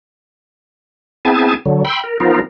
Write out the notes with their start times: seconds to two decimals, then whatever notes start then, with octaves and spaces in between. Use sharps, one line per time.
1.25 B3 C4 E4 G#4 G#5 A5
1.66 D3 F#3
1.85 G5 B5 C6 E6
2.04 A#4
2.20 F3 B3 D#4 F4 A#4